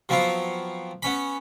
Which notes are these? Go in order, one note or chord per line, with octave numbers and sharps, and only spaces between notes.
F3 F#3 B3 C4 F4
B3 C#4 B5